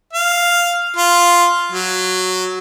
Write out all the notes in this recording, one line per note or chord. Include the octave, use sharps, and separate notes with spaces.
F5
F4
F#3